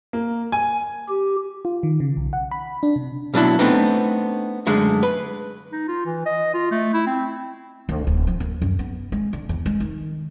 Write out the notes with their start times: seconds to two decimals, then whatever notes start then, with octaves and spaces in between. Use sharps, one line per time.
0.13 A#3
0.52 G#5
1.09 G4
1.65 F4
1.83 D#3
2.00 C#3
2.17 B1
2.33 F#5
2.51 B5
2.83 D4
2.96 C3
3.34 B2 F#3 D4 E4
3.59 A3 B3 C4 D4 D#4
4.67 F#2 D3 G#3 A3
5.03 B4
5.72 D#4
5.88 F4
6.05 E3
6.26 D#5
6.54 F4
6.71 A3
6.94 E4
7.07 C4
7.89 D2
8.07 D1
8.27 F3
8.40 A#3
8.62 F#2
8.79 B3
9.12 G#3
9.33 D3
9.49 E2
9.66 G#3
9.80 D#3